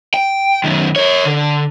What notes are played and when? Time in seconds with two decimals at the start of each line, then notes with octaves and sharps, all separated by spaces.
0.14 G5
0.64 F#2 D#3
0.96 A#4 C#5
1.25 D3